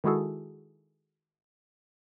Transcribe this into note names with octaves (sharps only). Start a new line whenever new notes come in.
D#3 G#3 E4 F#4 G#4 A4